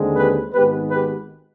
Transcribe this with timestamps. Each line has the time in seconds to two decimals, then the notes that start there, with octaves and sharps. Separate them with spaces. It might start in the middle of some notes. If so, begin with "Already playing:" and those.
Already playing: D#2 D3 G#3 C4
0.16 G4 B4
0.53 G#1 G#2 D#3 G#3 B3 G4 B4
0.91 G4 B4